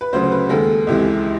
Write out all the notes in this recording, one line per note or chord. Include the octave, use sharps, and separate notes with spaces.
B4
D2 C#3 F#3 C5
B4
D#2 D#3 G#3 A4
C#2 C3 E3 G#3